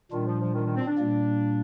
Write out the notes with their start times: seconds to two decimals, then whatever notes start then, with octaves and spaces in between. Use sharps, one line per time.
0.12 A#2 D#3 G3 D4 F4
0.26 F3
0.41 F3
0.54 D#3
0.65 D#3
0.76 C4
0.87 D4
0.98 A#2 G3 A#3